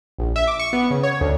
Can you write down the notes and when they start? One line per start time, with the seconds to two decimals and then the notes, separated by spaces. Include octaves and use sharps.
0.19 A#1
0.36 E5
0.47 D6
0.59 C#6
0.73 B3
0.91 C#3
1.03 C#5
1.21 D2